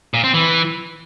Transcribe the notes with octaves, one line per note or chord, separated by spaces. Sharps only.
A#2
C4
E3